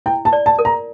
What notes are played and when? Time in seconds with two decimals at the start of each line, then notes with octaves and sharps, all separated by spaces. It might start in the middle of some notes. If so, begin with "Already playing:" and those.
0.06 E4 G5
0.25 A5
0.33 D5
0.46 A5
0.59 A#4
0.65 A#5